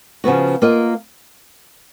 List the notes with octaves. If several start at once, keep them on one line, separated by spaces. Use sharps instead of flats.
C#3 F3 B3 F#4
A#3 F4 A#4 D#5